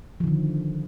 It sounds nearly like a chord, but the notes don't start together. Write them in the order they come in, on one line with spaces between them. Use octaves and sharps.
F3 D#3 D3